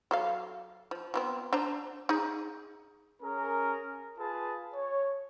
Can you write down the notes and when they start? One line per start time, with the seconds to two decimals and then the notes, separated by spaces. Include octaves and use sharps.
0.11 F#3 A4 F5
0.91 F3
1.14 F3 B3 C4
1.53 D4 C5 A#5
2.09 D#4 G#4
3.23 C#4 G#4 A#4
4.18 F4 G#4 B4 A5
4.74 C#5